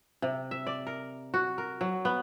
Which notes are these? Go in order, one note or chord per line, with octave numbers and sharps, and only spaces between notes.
C3
E5
D5
A#4
F#4
A#4
F#3
B3